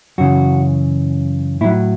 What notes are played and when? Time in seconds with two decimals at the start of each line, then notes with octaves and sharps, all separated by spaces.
0.18 F#2 C#3 E3 F#4
1.61 A2 E4
1.65 F#3